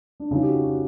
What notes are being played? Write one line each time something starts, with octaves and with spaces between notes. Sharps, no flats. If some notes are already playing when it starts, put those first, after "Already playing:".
D4
C#3 F3 D#4
G4
F#4
F#4